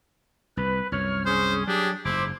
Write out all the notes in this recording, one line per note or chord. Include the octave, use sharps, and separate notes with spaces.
C2 B4
C2 F#2 C#5 F6
C#4 G#4 C5
F#3 D4 G4 G#4
F#1 G#2 E4 C5 D6